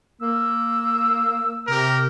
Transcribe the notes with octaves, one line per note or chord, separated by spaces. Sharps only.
A#3 E6
C3 G4 A#4